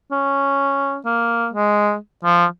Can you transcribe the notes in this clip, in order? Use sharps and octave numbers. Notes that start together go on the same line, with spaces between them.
C#4
A#3
G#3
F3